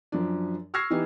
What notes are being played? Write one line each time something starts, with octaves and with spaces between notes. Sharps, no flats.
F#2 F3 D4
C#6 E6 F6 G#6 A#6 C7
E3 B3 D#4 G4